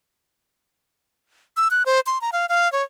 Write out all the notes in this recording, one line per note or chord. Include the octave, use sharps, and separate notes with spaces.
E6
F#6
C5
C6
A#5
F5
F5
C#5